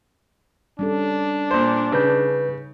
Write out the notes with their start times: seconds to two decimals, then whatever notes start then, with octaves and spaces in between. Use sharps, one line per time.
0.79 G3 C#4 D4 A4
1.51 A#2 C5
1.92 C#3 D#4 G#4 B4 G6